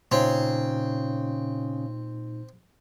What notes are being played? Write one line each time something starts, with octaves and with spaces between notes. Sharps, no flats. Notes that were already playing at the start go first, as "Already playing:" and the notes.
A#2 C#3 C4 D#4